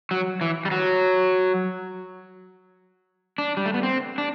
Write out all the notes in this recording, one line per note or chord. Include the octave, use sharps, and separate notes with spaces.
F#3
E3
G3
F#3
D4
G3
A3
B3
C4
D4